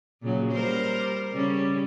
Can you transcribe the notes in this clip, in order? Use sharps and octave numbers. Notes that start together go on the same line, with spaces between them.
A#2 C#3 F#3
G3 A#4 C5
C#3 G3 C#4